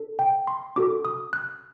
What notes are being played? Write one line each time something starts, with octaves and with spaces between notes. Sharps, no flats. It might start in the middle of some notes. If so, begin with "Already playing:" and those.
Already playing: D4 A4
G5
C6
D4 F#4 A4 D6
D#6
F#6